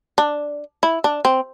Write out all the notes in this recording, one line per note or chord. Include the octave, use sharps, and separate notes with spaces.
D4
E4
D4
C4